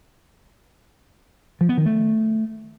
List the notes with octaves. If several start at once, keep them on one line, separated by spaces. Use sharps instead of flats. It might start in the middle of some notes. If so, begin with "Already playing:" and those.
F3
B3
D#3
A3